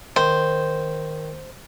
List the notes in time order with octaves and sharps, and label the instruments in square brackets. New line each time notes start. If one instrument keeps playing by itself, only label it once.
[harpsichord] D#3 [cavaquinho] C5